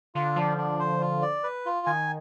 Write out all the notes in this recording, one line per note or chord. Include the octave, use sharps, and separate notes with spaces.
D3 F4
F3 D4
D4
C5
F4
D5
B4
F4
D#3 G#5